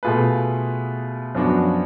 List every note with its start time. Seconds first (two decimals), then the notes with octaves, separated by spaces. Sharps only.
0.03 B2 A3 F4 G#4 B4
1.35 F#2 F3 B3 D4 F#4